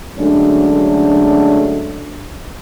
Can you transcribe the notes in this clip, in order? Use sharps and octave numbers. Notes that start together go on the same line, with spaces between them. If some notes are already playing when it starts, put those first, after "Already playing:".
D3 F#3 G#3 A3 C#4 D4